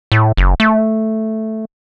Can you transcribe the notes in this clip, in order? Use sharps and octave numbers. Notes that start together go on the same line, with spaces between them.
A2
F#1
A3